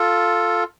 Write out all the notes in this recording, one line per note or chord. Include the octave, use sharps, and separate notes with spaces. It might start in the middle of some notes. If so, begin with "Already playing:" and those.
Already playing: F4 A4